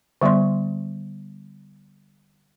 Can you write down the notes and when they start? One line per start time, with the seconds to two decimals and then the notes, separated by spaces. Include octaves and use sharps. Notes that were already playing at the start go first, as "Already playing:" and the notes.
0.22 D3 G3 B3 D5 C6